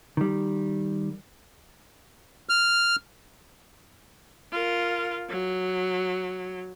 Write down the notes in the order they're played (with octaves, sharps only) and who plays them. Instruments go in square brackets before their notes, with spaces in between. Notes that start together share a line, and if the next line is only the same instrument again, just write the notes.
[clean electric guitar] D#3 G3
[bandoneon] F6
[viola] F4 A#4
F#3